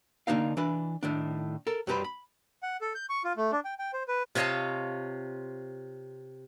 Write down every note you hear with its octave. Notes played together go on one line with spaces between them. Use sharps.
D3 A#3 D4 D#4 F5
E3 D4 B4
A2 D#3 D4
A4 A#4
F#2 F#3 G3 D4 B4 C5
B5
F#5
A4
G6
C#6
F4
A3
D4
G5
G5
C5
B4
C3 F4 C#5 D#5 F5 A5